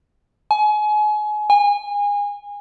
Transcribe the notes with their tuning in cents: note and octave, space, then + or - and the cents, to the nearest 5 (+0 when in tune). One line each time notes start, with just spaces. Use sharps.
G#5 +30
G#5 -30